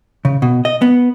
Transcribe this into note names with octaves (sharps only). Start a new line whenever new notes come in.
C#3
B2
D#5
B3